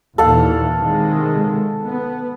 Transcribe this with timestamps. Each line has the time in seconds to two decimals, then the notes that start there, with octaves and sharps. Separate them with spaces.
0.18 D#2 A#2 E3 A4 F5 F#5
0.78 C3 D#3 G#3
1.86 B3